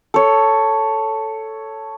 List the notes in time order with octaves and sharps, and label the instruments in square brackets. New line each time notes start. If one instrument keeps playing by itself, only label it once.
[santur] A4 C#5